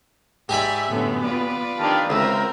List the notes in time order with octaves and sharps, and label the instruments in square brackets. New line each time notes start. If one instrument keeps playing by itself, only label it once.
[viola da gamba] G#2 [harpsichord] G4 G#5 B5 [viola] D5 E5
[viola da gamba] F#2 A2 D3 [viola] B3
[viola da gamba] F4 B4 D5
[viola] D#3 D4 [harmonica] G4 F5 A5
[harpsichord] C#2 [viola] C4 A#4 [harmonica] E5 E6